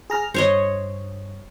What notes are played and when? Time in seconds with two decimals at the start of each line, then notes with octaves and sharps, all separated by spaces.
0.10 G#4 A#5 F6
0.34 G2 C5 C#5 D#5